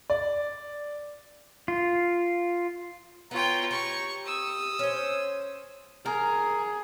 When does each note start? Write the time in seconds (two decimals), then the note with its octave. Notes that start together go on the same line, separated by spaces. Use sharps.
0.10 D5
1.68 F4
3.31 B3 F4 C#5 G5 A#5
3.71 G4 C#6
4.26 D#6 E6
4.79 C#4 C5
6.06 G#4 A#4